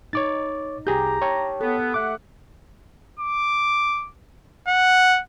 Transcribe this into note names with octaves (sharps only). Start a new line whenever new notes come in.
D#4 C#5 D6 A6
C2 G4 G#4 A#5 G6
C#5 G5 A5
B3 A4
A3 E5 F#5 D6
D6
F#5